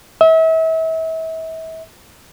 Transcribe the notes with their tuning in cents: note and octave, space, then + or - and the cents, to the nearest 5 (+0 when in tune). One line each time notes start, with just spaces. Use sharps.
E5 -35